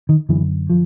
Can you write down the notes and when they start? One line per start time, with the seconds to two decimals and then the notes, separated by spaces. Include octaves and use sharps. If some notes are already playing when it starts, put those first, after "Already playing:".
0.09 D#3
0.29 F#2 D3 E3
0.70 F3